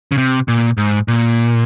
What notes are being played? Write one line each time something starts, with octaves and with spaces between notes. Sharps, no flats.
C#3
C3
A#2
G#2
A#2